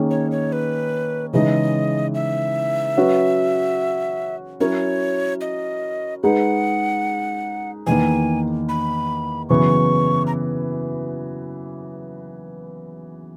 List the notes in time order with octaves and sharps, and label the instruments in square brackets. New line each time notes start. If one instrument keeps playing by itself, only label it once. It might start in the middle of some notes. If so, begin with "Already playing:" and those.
Already playing: [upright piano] D#3 A#3 C#4 G#4
[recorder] C#5
C#5
B4
[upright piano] C#3 E3 G#3 D#4 [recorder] D#5
[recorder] E5
[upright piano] F#3 C#4 F#4 B4
[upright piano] F#3 C#4 E4 A#4 [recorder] C#5
[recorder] D#5
[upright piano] G#3 D#4 G#4 B4 [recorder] F#5
[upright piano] E2 D#3 A#3 [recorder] G#5
[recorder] B5
[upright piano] F#2 C#3 E3 B3 [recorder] C#6
[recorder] A#5